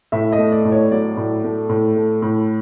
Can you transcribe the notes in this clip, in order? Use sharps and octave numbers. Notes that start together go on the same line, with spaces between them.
A2 E5
D#5
A3
D5
A2
C#5
F#3 D5
A2
A3
A2
A3
A2